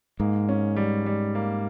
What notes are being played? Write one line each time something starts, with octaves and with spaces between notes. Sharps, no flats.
G#2 A#3
C#4
G3
G3
A#3